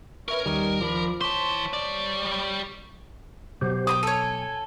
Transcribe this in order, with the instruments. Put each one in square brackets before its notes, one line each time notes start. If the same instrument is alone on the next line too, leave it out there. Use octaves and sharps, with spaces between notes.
[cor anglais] C#4 [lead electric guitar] A#4 [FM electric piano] B4 E5 C#6
[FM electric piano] D#2 D#3 [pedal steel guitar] G3 D#4
[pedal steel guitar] F3 B5 [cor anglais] D4
[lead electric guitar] E3 C6 [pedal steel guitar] C5 A5 [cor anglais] C#5 [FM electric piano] D6 B6
[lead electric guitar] G3 D5
[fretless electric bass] B2 F#3 [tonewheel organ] G4 C5
[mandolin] G5 C6 D6 [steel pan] D#6
[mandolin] A4 C#5 [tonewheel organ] G#5